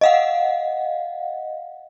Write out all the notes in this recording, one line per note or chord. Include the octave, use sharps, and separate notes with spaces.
D#5 F5 F#5